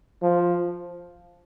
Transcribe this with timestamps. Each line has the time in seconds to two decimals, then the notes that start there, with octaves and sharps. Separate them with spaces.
0.22 F3